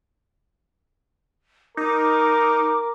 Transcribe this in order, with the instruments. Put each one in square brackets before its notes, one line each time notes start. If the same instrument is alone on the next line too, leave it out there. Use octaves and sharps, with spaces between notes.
[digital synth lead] D#4 [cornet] A#4 [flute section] D6